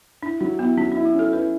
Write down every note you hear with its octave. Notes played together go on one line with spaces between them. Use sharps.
D4 E4
F#3 D4
B3 E4
F#3 C#4
D4 E4
F#4
C#4 A4
E4 B4